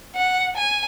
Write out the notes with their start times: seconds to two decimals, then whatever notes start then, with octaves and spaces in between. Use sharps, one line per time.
0.16 F#5
0.57 G#5